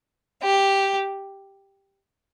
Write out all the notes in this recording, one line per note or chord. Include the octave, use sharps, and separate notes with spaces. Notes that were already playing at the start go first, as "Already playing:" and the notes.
G4